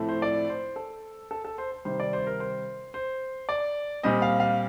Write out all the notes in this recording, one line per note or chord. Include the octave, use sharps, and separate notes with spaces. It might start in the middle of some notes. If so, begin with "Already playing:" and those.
Already playing: A2 F3 A3 C4
C5
D5
C5
A4
A4
A4
C5
C5
C3 D#3 G3 C5
D5
C5
A#4
C5
C5
D5
A#2 G3 C4 D#5
F5
F5